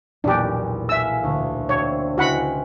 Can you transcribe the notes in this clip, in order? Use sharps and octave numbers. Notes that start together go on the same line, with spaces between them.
B1 E2 A#2 D4 G4
G#4 E5 F5 E6
D2
C4 D4 C#5
C#2 C4 E4 F#4 F#5 B5